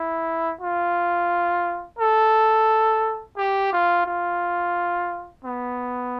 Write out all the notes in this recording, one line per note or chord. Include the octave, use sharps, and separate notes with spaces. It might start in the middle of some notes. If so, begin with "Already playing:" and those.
Already playing: E4
F4
A4
G4
F4
F4
B3